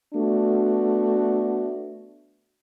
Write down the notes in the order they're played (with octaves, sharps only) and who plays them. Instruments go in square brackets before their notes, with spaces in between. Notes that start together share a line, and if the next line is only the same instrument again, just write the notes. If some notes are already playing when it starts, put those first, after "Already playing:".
[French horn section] A3 B3 D4 F#4